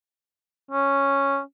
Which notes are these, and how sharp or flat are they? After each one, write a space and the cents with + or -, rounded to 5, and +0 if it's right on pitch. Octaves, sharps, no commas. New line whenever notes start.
C#4 -5